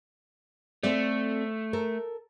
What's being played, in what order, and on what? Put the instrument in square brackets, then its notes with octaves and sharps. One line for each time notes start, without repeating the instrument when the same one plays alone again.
[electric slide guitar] A3 [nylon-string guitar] C4 A4 D5
[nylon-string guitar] A4 A#4